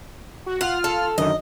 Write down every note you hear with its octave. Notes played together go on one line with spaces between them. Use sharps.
F#4
F4 F#5 F6
A4
F#2 D3 D#3 D#5